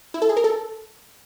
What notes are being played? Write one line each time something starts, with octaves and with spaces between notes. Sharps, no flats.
E4
A4
G#4
A#4
A4